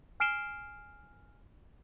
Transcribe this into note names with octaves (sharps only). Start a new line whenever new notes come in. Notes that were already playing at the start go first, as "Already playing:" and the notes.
G#5 F6 C7 D7 E7 G7